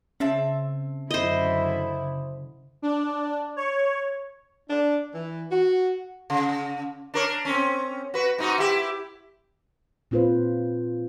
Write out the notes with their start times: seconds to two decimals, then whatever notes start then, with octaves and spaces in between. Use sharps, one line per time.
0.20 C#3 C4 E5 A5
1.11 F#2 D3 E4 C5 D#5
2.82 D4
3.56 C#5
4.69 D4
5.14 E3
5.51 F#4
6.30 C#3
7.14 D4 A#4 C#5
7.45 C4 C#4
8.14 F#4 B4
8.38 G#2 D#4 F#4
8.58 E4 G4
10.11 A#2 C4 F4 B4 C5